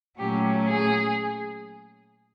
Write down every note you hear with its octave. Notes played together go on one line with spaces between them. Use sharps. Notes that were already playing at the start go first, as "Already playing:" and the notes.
A#2 F#3 A3 C#4 G4
G#4